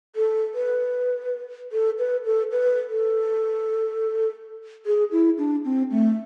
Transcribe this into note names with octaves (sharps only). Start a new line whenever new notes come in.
A4
B4
A4
B4
A4
B4
A4
G#4
E4
D4
C4
A3